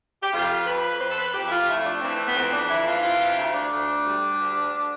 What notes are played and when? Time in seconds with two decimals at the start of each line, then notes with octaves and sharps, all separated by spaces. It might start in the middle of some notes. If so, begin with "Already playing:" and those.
0.22 G4
0.33 F2 F4
0.66 F2 B4
1.01 F2 C5
1.10 A4
1.18 B4
1.34 F2 G4
1.47 E4
1.52 F4
1.68 A3 E4
1.85 D4
2.02 E3 C4
2.28 B3
2.36 F2 C4
2.53 D4
2.70 E3 E4
2.87 F4
3.03 C3 F4
3.21 F4
3.38 D2 E4
3.55 D4
3.71 D2
4.06 G3
4.39 D2